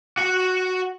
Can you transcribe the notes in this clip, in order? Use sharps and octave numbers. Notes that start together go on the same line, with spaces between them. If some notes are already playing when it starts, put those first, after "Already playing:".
F#4 F#5